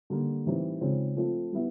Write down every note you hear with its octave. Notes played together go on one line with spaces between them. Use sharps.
D3 G3 A#3
A2 E3 G3 C4 D#4
C#3 F3 G#3 C4 D#4
F3 A3 C4 F4
G3 B3 E4